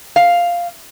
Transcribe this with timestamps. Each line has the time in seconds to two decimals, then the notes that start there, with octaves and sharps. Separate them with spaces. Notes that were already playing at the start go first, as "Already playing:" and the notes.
0.16 F5